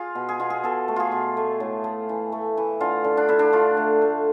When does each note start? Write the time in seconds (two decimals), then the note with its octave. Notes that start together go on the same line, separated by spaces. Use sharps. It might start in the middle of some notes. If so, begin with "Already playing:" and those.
Already playing: F4 G#4
0.15 B2
0.29 G#4
0.40 B2 F4
0.50 G#4
0.64 B2 A4
0.88 A3
0.96 F4 G#4
1.12 B2
1.37 A3
1.60 A2
1.84 A3
2.09 E3
2.32 A3
2.57 E3
2.80 D3 F4
3.04 D3
3.17 D4
3.29 D3 E4
3.39 D4
3.53 A3 F4
3.77 A3
4.02 A3